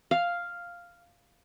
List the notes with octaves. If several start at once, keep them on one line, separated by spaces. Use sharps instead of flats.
F5